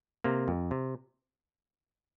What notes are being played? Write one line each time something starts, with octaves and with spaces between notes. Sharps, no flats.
C3 A#3
F2
C3